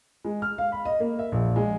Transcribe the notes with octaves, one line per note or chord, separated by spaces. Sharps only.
G#3
F6
F5
B5
D#5
A#3
E5
A#1
G#3